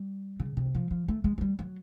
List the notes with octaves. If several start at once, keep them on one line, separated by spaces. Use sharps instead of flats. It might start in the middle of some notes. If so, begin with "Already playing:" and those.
Already playing: G3
C#3
C3
F#3
F3
F3
A3
G#3
F#3
G3
F#3